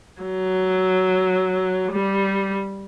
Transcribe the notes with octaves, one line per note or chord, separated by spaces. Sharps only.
F#3
G3